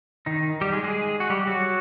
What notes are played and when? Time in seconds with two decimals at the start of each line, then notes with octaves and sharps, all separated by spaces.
0.26 D#3 D#4
0.61 G3 G4
0.72 G#3 G#4
0.83 G#3 G#4
1.20 F#4
1.30 G3 G4
1.47 F#3 F#4